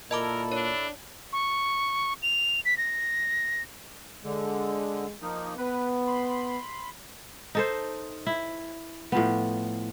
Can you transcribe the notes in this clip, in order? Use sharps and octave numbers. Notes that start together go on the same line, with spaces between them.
A#2 E4 A4 A#4 D#5 A5 D6
D4 C#5
C#6
F7
B6
A#6
D3 G#3
F3 A#3 D#4
B3 B4
B5 C6
D#4 A4 C5
E4
A2 F3 B3